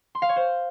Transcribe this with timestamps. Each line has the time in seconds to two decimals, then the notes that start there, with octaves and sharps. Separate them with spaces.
0.15 C6
0.22 F5
0.29 C#5
0.36 C5